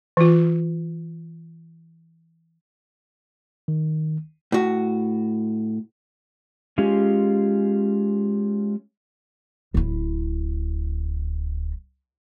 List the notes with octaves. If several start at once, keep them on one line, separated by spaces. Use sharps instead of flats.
E3 F4
D#3
A2 F#4
G#3 C#4 F4 G4 G#4
D1 E4